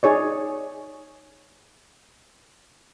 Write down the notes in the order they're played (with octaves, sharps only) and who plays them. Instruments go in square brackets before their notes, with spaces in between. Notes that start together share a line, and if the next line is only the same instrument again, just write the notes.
[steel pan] D#4 G#4 C#5 D5